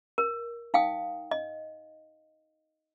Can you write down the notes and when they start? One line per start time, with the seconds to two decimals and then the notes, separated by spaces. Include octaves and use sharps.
0.18 A#4
0.74 D#4 F5 G5 D#6
1.31 D#5